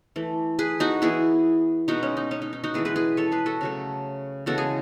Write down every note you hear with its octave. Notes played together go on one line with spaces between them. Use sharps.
E3 A3
G#4 B4
D#4 F#4
E3 B3 E4 G#4
B2 G#3 B3 D#4 F#4
C#4
D#4
C#4
D#4
D#4
D#4 F#4
E3 G#3 B3 E4 G#4
G#4 B4
G#4 B4
A4 C#5
G#4 B4
F#4 A4
C#3 F#3 A3
C#3 E3 G#3 B3 F#4 A4
G#4